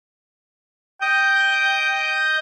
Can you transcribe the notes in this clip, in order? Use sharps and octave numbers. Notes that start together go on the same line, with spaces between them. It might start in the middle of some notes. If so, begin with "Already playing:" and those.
D#5 G5 D#6 G6